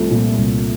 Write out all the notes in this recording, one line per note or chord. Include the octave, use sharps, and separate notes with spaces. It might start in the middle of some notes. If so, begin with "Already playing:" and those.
Already playing: C2 F3 A3
A#2
C2